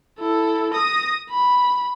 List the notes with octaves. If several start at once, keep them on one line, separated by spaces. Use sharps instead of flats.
E4 A4
D#6 A#6
B5